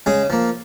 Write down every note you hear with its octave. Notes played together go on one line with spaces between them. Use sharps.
C#3 G#3 G#4
F3 A#3